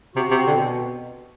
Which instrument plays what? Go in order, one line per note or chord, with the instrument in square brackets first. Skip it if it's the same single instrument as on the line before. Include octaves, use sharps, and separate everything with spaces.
[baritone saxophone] C3 [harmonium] F#4
[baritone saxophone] C3 [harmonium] C4
[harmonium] B2 [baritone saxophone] D3